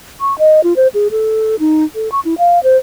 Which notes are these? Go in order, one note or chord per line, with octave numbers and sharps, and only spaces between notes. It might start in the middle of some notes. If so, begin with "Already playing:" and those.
C#6
D#5
F4
C5
G#4
A4
D#4
A4
C#6
E4
F5
C5